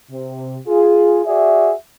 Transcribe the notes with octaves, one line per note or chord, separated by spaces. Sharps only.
C3
F4 G#4
F#4 G#4 D5 E5